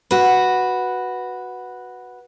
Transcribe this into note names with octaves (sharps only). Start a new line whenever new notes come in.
F#4 B4